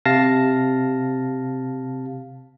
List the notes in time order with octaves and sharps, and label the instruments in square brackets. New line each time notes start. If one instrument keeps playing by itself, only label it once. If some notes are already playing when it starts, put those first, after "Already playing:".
[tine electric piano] C3 F5 A5 A#6